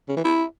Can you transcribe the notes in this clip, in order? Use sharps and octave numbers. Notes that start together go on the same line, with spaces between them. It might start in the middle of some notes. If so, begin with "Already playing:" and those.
C#3
E3
E4